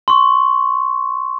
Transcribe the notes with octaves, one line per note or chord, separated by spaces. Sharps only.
C6 C#6